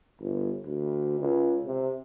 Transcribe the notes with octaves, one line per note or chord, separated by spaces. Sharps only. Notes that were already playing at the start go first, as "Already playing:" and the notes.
G1
D2
C#2
C3